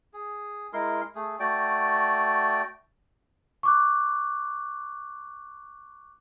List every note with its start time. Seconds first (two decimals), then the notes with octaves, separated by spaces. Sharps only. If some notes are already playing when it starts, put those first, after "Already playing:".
0.13 G#4
0.73 G#3 E4 A#4 C6
1.15 A3 G#4
1.40 A3 F#4 D5 G5
3.63 C#6 D6 F#6